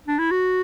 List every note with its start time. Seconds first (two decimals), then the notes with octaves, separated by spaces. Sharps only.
0.07 D4
0.19 E4
0.31 F#4